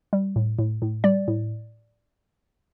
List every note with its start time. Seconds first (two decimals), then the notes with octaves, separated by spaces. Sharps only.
0.13 G3
0.36 A2
0.59 A2
0.82 A2
1.04 G3 D5
1.28 A2